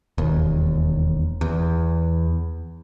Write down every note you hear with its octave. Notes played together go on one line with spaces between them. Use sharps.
E1 D#2
E2